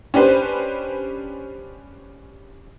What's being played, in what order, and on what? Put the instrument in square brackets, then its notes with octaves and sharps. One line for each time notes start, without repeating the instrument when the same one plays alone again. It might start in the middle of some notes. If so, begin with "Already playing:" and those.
[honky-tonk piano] C#4 D4 G4 B4 C5